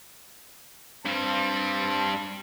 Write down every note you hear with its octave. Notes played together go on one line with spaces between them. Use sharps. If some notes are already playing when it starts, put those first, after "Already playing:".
G2 G3 C4 A5